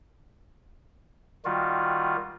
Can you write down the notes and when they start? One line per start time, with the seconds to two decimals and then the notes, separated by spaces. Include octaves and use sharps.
1.45 D#3 G3 F4 F#4